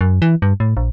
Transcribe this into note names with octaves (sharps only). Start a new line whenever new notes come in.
F#2
E3
G2
A2
A#1